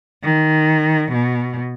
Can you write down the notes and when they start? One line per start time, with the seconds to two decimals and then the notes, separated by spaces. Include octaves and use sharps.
0.24 D#3
1.12 B2